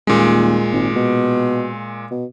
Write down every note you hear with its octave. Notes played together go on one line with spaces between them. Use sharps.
D#1 A#2 G#3
G#1
B2
B2